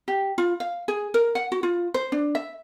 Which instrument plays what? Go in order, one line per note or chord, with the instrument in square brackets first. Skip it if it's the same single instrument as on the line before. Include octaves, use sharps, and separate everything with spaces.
[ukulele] G4
F4
F5
G#4
A#4
F#5
F#4
F4
C5
D4
E5